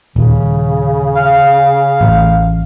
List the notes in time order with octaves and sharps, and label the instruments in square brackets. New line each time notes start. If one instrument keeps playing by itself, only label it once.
[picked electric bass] D#1 [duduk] C#3
[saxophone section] F5
[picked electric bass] A1